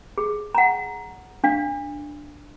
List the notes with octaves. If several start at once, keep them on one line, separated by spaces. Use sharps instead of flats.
G#4
F#5 A#5
D4 F5